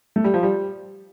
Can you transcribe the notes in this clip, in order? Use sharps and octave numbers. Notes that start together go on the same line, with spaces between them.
A3
G3
F3
G3